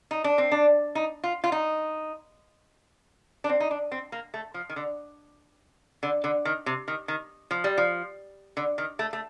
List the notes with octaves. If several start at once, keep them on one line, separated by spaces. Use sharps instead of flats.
D#4
D4
C4
D4
D#4
F4
F4
D#4
D4
C4
D#4
D4
C4
A#3
A3
F3
D#3
D3
D3
D3
D#3
C3
D#3
D#3
F3
G3
F3
D3
D#3
A3
A3